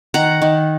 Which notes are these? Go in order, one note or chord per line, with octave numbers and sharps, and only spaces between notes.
D#3 F#5 A#5
D#3